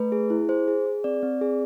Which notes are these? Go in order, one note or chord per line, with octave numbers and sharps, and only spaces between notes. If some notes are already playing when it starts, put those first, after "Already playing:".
Already playing: A3 B4
G#4
E4
G#4 C5
G#4
G#4
C4 D5
C4
G#4